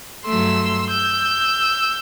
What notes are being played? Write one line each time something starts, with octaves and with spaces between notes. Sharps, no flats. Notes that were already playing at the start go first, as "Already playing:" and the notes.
G2 F#3 A3 C6 E6
E6 G6